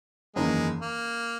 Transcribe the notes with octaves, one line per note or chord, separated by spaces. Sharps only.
F#1 E2 D#3 G#3 A#3
A#3